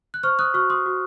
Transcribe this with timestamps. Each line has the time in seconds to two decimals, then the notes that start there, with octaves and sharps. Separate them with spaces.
0.14 F#6
0.23 C5 C#6 F6
0.39 D#6 F#6
0.54 F#4 C#6 F6
0.70 C6 D#6
0.86 F#4